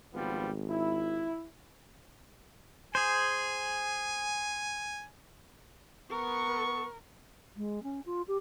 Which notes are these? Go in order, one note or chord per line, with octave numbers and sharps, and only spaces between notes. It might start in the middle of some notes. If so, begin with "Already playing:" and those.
G#1 F3 G3 B3
E4
G#4 C5 G#5
B3 A#4 C#6
G#3
C#4
F4
G4